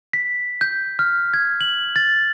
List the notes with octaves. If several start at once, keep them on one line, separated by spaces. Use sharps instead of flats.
B6
G6
F6
G#6
F#7
A6